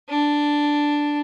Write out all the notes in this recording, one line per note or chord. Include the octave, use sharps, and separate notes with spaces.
D4